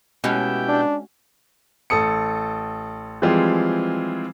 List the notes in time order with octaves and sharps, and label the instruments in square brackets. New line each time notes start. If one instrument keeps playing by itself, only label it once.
[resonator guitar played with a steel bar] B2 [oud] G#3 C#4 [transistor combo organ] E4 G4 G5
[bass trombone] D4
[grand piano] A1 A4 D#6 C#7
E3 F3 G3 G#3 C4 F4